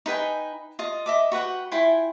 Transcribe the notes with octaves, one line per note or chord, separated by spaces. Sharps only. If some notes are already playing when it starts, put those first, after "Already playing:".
D#4 B4 G5 G#5
F4 D#5
D#5 E5 D6
F#4 B4 F#5 G5
E4 F4 G5 G#5